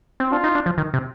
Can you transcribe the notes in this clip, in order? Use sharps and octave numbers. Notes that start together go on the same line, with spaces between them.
C4
D4 F4
D#4
D4
F3
D#3
C3